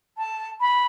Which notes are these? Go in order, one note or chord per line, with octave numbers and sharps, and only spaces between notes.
A5
B5